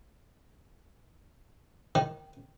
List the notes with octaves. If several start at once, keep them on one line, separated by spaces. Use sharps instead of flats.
D#3